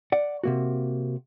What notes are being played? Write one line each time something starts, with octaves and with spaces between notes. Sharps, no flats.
D5 F#5
C3 A#3 F#4